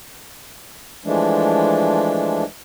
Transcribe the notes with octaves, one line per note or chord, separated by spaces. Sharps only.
E3 F3 G#3 A3 D4